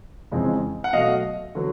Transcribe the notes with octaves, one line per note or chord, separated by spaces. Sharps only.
F2 C#3 E3 G#3 C4
F#5
B2 F#3 A3 D#5 F5
D3 F#3 B3